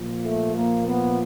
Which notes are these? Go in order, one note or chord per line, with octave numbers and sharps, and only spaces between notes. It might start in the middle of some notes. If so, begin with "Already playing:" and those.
Already playing: A#2 F3
A3
A#3
B3